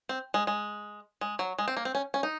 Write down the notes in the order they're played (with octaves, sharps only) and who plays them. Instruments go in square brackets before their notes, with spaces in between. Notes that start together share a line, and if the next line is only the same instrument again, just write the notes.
[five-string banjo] C4
G#3
G#3
G#3
F#3
G#3
C4
A#3
C4
C#4
C#4
D#4